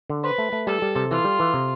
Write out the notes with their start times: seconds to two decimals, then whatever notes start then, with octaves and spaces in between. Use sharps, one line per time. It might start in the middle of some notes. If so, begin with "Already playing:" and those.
0.10 D3
0.24 B4 C5
0.38 A3
0.53 A3
0.67 G3 A4
0.82 G3
0.96 C3
1.10 E3 F4
1.25 G3
1.40 E3
1.54 C3